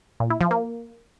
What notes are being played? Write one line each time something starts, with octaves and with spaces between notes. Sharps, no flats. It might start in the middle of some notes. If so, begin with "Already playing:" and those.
A#2
E4
F3
A#3